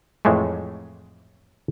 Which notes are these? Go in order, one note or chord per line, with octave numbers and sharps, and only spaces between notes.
F2 A2 E3 G#3 A3